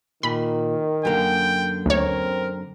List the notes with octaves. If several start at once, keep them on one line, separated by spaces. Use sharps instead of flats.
A#2 D#3 B5
F#2 D3 A#3 G5
D2 C4 A#4 C#5